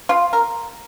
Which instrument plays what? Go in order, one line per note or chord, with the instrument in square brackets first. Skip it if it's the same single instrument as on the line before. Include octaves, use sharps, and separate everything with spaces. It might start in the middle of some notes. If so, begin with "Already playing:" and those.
[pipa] F4
A#4